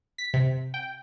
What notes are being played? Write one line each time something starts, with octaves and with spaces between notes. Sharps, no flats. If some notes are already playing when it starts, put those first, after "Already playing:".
B6
C3
G5